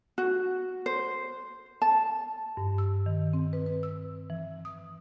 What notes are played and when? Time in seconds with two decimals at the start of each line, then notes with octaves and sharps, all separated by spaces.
0.18 F#4
0.86 C5
1.82 A5
2.57 G2
2.78 E6
3.06 D#3
3.33 C4
3.53 B4
3.66 B4
3.83 E6
4.30 E3
4.65 D#6